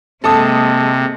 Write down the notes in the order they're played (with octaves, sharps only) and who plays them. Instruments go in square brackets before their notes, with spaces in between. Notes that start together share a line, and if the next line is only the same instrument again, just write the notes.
[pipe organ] C3 [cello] G#3 A#3 [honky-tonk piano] A4 A5 D#6